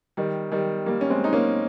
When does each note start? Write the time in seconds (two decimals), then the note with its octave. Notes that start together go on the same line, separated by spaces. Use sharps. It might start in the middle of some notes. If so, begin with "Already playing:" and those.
0.17 D#3 G3
0.52 D#3 G3
0.86 G3 A#3
1.01 C#4
1.10 G#3 C4
1.24 D#4
1.33 A#3 C#4